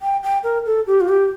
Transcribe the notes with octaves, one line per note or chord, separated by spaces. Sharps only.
G5
G5
A#4
A4
G4
F4
G4